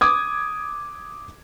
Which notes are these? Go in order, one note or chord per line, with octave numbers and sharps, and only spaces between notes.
D6 D#6 G#6